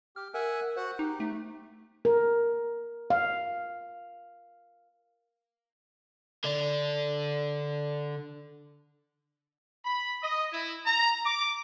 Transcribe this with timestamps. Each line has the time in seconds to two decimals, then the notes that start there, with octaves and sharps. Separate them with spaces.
0.16 G4 F6
0.34 A#4 E5 F#5 G#5
0.77 F#4 C5 F#5
0.99 D#4 G4
1.20 A3
2.05 A#4
3.10 F5
6.44 D3 D4
9.84 B5
10.22 D#5
10.52 E4
10.86 A#5
11.25 D6